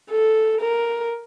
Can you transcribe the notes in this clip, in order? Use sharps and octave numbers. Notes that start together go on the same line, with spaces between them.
A4
A#4